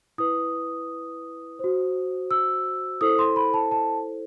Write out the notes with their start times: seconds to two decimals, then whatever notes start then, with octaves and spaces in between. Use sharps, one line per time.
0.18 E4 B4 D#6
1.59 F#4 C5
2.31 E6
3.01 E4 A4 C5 D#6
3.19 C6
3.36 B5
3.54 A5
3.71 A5